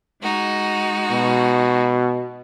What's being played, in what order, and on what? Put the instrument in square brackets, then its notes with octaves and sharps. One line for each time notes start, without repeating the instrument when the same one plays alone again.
[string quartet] G#3 D#4 F#4
[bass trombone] B2